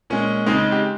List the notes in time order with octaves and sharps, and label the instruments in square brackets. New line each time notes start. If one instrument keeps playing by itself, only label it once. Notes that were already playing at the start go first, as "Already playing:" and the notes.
[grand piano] A#2 G#3 C#4
C#3 G#3 C4 D#4
G4